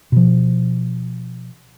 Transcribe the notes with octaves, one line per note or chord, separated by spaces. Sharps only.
B2 F3